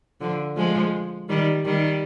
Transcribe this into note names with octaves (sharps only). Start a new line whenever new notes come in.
D3 F3
F3 G#3
D#3 G3
D#3 G3